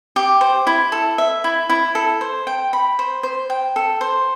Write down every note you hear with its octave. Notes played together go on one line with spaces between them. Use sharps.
G4
C5
E4
A4
E5
E4
E4
A4
C5
G5
B5
C5
C5
G5
A4
C5